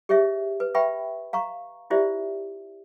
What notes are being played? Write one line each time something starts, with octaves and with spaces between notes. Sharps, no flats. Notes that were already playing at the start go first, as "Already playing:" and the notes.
G4 G#4 C#5 D#5 E5
B4
B4 E5 G5 B5 C#6
F5 A#5 C#6
E4 F4 G4 C5 D5 E5